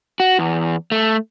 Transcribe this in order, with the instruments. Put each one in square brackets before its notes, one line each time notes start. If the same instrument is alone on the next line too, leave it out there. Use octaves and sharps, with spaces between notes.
[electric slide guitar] F#4
E2
A3